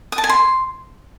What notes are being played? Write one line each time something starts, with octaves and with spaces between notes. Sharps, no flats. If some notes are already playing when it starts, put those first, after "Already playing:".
D#6
A5
G#5
C6